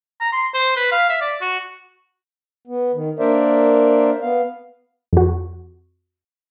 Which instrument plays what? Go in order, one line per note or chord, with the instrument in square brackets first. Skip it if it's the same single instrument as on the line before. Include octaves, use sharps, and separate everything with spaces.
[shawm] A#5
C6
C5
B4
F5
E5
D5
F#4
[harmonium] B3
D#3
A#3 D4 A#4 C5 D5 E5
B3 F5
[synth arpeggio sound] F2 F#4